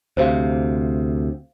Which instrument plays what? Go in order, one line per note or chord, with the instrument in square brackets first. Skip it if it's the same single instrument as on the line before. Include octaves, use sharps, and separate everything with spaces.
[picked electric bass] D2 C3 [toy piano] C5 F5